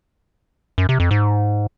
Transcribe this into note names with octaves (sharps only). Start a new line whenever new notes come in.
F#2
C3
F2
G#2